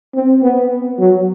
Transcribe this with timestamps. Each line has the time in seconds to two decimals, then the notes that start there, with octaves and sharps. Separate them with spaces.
0.15 C4
0.43 B3
0.99 F#3